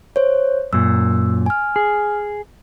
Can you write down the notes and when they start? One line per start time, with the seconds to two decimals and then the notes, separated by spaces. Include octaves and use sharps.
0.16 C5 C#5
0.73 F#2 A#2 E6
1.46 G#5 F6
1.76 G#4